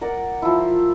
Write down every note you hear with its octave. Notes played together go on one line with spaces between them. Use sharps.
A#4 D5 F#5
F3 E4